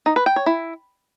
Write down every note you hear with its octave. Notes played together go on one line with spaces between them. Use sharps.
D#4
B4
G5
C#5
E4